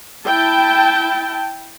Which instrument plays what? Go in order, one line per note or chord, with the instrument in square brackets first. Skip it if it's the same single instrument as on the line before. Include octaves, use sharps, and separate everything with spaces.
[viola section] E4 G5 A5